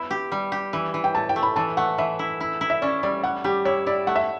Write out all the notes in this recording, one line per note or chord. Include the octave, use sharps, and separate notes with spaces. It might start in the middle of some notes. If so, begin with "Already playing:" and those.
Already playing: B3 E4 B5
G4
G3
G4
E3
E3
G5
A2 A5
G5
A3
B5
E3 A5
A3 F#5
E3 E5
E4
E4
E4
E5
C#4 D5
G3 D5
G3 F#5
G3 G4
E4 C#5
E4 D5
A3 F#5
E5